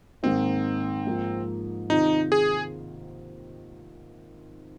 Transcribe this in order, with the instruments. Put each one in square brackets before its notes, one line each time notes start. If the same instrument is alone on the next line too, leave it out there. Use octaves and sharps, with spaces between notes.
[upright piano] G#2 D#3 A#3 D#4 [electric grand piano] C4
[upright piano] G#2 F3 A#3
[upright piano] C3 D#3 C4 F4 [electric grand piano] D#4
[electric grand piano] G#4